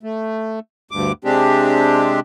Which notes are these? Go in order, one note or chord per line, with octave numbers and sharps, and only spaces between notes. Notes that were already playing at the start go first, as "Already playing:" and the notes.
A3
D2 G2 D6
C3 G#3 C4 D4 G4